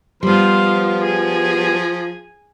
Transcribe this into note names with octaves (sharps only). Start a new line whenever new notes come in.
F3 G3 B3 C5 F5
G#4 G#5